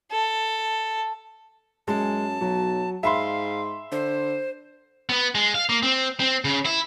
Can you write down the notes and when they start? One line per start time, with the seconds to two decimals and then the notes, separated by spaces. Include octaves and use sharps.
0.12 A4
1.88 F#2 G#3 A5
2.41 B1 F#3
3.03 G#2 E5 F5 B5 C6
3.92 D3 C5
5.09 B3
5.35 G#3
5.55 F5
5.69 A#3
5.83 C4
6.20 C4
6.45 C#3
6.66 E4